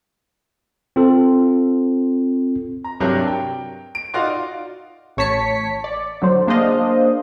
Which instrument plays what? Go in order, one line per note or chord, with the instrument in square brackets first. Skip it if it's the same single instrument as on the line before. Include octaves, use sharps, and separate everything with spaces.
[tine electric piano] C4 F4 A4
[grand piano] A#5
G2 C3 F#3 D4 A#4 G6
G5
D7
D#4 F4 F#4 D5 F5 C6
[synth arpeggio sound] A1 C#5 A5 B6 C#7
D5
D3 F#3 C5
A#3 D4 G#4 C5 D#5 F5